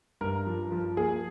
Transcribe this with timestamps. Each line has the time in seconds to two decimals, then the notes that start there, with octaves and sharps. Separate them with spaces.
0.21 G2 A#4
0.47 F3
0.72 F3
0.97 A#3 G#4